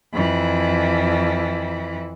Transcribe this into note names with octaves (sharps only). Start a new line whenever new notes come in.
F2 E3